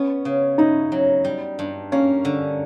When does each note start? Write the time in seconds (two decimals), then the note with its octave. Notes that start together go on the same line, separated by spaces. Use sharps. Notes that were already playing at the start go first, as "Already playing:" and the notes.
Already playing: B3 C#4
0.25 C#3
0.58 D#4 E4
0.92 F#3
1.25 G3
1.59 G2
1.92 A#3 C#4
2.25 D3